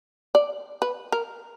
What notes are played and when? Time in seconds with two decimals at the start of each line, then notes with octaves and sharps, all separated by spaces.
0.35 D5
0.82 B4
1.12 A#4